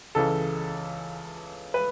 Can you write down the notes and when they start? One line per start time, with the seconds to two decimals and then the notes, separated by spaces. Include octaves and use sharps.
0.15 C#2 C#3 E3 A4
1.74 B4